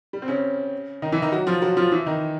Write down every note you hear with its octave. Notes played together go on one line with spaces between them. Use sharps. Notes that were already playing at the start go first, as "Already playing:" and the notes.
G3
C4
C#3 C#4
D#3 D#4
E3 E4
D#3 D#4
F#3 F#4
F3 F4
F#3 F#4
F3 F4
E3 E4
D#3 D#4